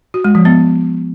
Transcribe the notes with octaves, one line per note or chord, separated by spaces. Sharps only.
F#4
G#3
F3
B3